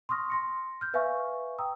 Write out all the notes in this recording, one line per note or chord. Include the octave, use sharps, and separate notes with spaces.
C6 C#6 D#6 F6 A#6
C6 A#6 C#7
F6 G6
B4 E5 F5 G#5 C#6
G5 A#5 D#6 E6